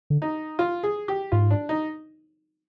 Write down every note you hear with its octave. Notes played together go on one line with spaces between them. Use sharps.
D3
D#4
F4
G#4
G4
G#2 F4
D4
D#4